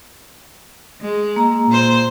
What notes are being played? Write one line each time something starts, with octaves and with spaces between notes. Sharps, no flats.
G#3
A#3 A#5
A#2 C5